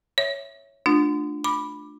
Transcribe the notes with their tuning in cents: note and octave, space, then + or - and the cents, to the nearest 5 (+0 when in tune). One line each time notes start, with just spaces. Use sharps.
C#5 +0 E5 +0
A3 +0 D4 +15 F4 +10
B5 +0 D6 +10